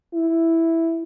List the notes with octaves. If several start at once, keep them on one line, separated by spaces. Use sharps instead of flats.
E4